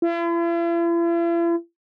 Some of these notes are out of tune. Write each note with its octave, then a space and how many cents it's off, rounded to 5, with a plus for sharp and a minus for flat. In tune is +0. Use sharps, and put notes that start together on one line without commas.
E4 +45